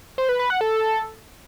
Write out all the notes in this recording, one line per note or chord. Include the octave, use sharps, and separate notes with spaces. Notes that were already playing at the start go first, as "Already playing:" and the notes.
C5
B4
B4
F#5
A4